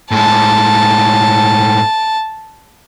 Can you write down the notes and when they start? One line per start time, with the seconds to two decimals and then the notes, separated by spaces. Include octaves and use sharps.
0.11 A2 G#3 A5